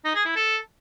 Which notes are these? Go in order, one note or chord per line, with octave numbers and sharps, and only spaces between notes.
D#4
G#4
E4
A4